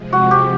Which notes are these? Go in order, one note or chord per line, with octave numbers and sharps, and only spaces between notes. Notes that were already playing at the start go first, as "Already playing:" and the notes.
Already playing: C3 F3 G#3
F#4
G4